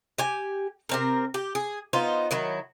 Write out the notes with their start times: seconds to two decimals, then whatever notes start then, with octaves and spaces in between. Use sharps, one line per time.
0.18 G4 G#5
0.89 C3 C4 A#4
1.34 G4
1.55 G#4
1.93 B3 D#4 F4 C5
2.31 D#3 F#3 E4